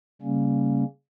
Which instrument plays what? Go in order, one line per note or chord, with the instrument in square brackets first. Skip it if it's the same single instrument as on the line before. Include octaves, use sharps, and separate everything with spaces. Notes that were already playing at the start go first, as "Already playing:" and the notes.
[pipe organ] C#3 G3 A#3 C#4